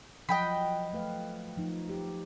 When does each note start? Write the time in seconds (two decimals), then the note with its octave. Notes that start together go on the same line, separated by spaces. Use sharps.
0.29 F3 F#3 D#5 F#5 G5 B5
0.93 A3 B4 F5
1.58 F3 D#4
1.89 G4